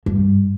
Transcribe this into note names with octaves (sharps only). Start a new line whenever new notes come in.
G2